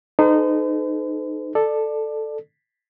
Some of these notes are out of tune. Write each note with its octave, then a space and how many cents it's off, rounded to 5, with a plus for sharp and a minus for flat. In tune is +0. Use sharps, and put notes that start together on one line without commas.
D#4 -20 A4 -30 C5 -45
A4 +0 D5 +20